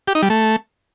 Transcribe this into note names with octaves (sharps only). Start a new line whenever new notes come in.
G4
D#4
G3
A3